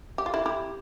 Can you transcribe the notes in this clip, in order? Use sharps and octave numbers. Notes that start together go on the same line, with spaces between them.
G4
F4
E4 G4
E4 G4